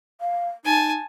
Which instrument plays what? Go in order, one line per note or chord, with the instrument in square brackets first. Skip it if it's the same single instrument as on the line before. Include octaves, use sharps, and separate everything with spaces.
[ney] F5
[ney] D#4 [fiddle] G#5 A5